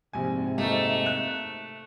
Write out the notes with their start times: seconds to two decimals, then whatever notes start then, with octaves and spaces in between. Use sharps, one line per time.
0.13 A#1 G#2 C3 G#5
0.58 A3 A#3 D#4 A4
1.06 F#6